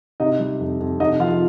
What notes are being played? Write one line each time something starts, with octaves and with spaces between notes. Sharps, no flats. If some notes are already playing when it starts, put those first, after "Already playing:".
C3 D#4 D#5
G3
F2
F2
C3 D#4 D#5
F3 F4 F5